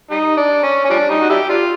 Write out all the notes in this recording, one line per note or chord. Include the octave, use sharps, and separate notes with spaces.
G3 D#4
D4
C#4
C#4
F3 G3 D4
G3 D#4
F#4
D4 E4 G4
D4 F4